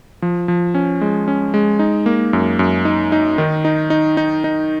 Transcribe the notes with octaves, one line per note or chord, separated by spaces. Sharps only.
F3
F3
C#4
G#3
C#4
G#3
D#4
A#3
F#2
F#2
D#4
D#4
D#3
D#4
D#4
D#4
D#4